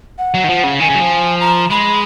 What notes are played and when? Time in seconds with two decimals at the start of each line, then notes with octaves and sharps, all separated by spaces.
0.18 F#5
0.34 F#3
0.44 D#3
0.49 F3
0.64 C#3
0.80 D#3 G#5
0.90 C#3
0.95 F#3
1.00 F3
1.40 A#5
1.71 G#3 B5